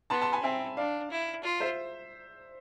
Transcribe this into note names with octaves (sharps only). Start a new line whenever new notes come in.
B3 A5 C6
A5 C6
G#5 B5
C4 E5 G#5
D4 D5 F5
E4
F4
C5 E5